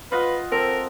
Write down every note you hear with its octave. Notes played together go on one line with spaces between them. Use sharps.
F4 B4 D#5 F#5
C4 A4 A#4